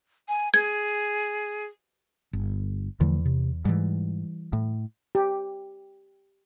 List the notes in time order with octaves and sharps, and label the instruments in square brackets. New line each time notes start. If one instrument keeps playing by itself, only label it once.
[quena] G#5
[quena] G#4 [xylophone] G#6
[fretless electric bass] G1
[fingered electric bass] E2 [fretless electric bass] D3 F3 A3
[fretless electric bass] C3
[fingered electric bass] G#2 [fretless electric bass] E3 G3
[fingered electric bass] A2
[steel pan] G4